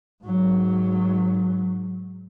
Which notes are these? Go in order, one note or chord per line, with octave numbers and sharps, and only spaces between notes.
G#2 F#3